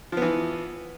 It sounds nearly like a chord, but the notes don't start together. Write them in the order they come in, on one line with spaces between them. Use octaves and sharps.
F3 B3 E3